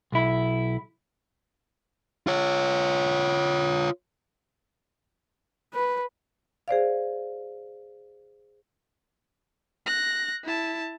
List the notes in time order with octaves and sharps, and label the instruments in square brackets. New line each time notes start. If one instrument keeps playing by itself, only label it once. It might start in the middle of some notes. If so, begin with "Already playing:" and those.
[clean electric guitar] B1 E4
[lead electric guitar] F4 C#5
[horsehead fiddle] B4
[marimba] G#4 C5 D5 F5
[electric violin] F#6 A#6
E4 A5